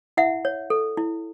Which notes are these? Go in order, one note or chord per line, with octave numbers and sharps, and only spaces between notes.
E4 E5 F#5
C#5
A4
E4